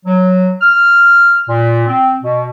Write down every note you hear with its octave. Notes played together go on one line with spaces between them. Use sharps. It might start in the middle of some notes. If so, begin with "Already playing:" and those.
F#3
F6
A#2
C4
B2